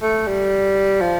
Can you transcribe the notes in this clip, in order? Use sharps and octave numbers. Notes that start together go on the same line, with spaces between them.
A3
G3
F3